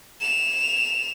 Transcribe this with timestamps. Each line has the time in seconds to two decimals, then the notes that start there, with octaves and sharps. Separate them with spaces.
0.21 E7 F7